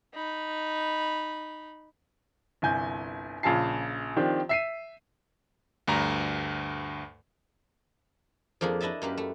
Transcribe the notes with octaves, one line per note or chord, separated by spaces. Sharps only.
D#4 B5
G1 C2 G#5 G6
A#1 C#3 F4 G#5 A5 C7
D#3 F3 C4 D4 G4
E5 C7 D#7
D2 G2 A#5
F2 F3 A#3 D4 G#4
D4 E4 D#5 E5 A5
F#2 A#3 G4 B4
A3